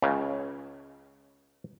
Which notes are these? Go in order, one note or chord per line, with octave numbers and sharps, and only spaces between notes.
C#2 C#3